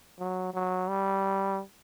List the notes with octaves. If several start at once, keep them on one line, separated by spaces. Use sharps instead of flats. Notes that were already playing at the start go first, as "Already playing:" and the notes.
F#3
F#3
G3